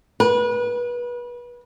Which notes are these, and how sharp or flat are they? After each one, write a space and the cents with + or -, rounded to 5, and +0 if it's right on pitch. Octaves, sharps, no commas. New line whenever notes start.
B4 -30